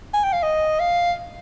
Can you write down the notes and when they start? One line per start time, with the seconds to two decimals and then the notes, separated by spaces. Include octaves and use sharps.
0.14 G#5
0.24 G5
0.33 F5
0.43 D#5
0.80 F5